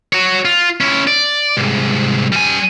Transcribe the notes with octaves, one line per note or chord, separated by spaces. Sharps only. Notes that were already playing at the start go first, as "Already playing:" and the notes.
F#4 C#5
F4
C#4 E4
D5
C2 G#2
G3 G#5